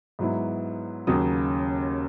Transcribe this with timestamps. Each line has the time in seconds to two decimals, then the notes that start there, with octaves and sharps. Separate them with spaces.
0.19 G#2 F#3 B3 E4
1.07 D#2 C#3 F#3 D#6